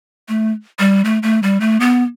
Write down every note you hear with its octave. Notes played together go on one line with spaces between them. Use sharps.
A3
G3
A3
A3
G3
A3
B3